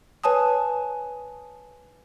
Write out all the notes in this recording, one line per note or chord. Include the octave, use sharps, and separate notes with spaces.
B4 C#5 G#5 A5 D#6